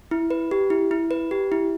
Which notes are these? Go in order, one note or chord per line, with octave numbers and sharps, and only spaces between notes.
E4
B4
G4
E4
E4
B4
G4
E4